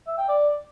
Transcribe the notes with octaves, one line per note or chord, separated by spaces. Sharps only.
E5
G5
D5